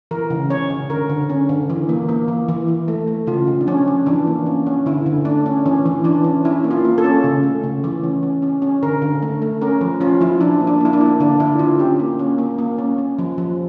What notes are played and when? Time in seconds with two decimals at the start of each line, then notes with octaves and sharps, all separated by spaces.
0.11 E3 A#4
0.30 C#3
0.50 C#4 C#5
0.70 C#3
0.90 D3 A#4
1.10 D3
1.30 C#4
1.49 D3
1.70 E3
1.89 A#3
2.09 A#3
2.28 E3
2.48 E3
2.68 E3
2.88 A3
3.08 A3
3.27 C#3 F4
3.47 C#3
3.61 D4
3.67 F3 C#4
3.88 C#4
4.06 E3 D4
4.27 A#3
4.46 C#4
4.67 C#4
4.86 D3 E4
5.06 D3
5.25 A3 D4
5.46 C#4
5.66 E3 C#4
5.86 E3
6.04 E3 D4
6.24 C#4
6.45 C#4 E4
6.64 A#3
6.71 F4
6.85 A#3
6.98 A4
7.04 C#4
7.24 C#3
7.43 A3
7.63 C#3
7.84 E3
8.04 C#4
8.23 C#4
8.42 C#4
8.62 C#4
8.83 D3 A#4
9.02 D3
9.22 A3
9.42 A3
9.62 C#4 A#4
9.81 F3
10.01 C#4 F4
10.21 F3 E4
10.41 F3 D4
10.60 A#3
10.67 D4
10.81 A#3 E4
10.93 D4
11.01 A#3
11.20 D3 D4
11.40 D3 E4
11.59 D3 F4
11.79 C#4 G4
12.00 A#3
12.19 C#4
12.38 A#3
12.58 A#3
12.78 C#4
12.98 C#4
13.19 F3
13.38 F3